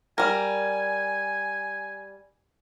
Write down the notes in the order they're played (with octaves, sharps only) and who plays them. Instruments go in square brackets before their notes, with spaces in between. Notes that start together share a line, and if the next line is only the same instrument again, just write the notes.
[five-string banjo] G3 A#4 [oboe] G#5